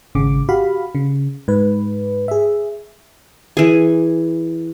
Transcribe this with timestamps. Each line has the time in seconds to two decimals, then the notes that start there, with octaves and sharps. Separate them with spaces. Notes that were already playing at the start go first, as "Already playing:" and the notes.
0.15 G#1 C#3 D6
0.49 F#4 G4 F5 B5
0.95 C#3
1.48 G#2 B4
2.28 G#4 E5
3.57 E3 G#4